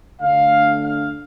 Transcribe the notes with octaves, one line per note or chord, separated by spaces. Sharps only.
D2 D3 A3 D4 F5
F5